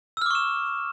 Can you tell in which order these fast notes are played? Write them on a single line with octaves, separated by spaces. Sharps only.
E6 F6 D6 C#6 E7